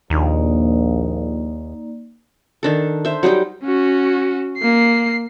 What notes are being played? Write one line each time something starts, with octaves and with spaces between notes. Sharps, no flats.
A#1 D#2 A#3 D#4 D5
D#3 D4 A4
C5 E5
F#3 G3 D#4 G4
C#4 F#4
A#3 C7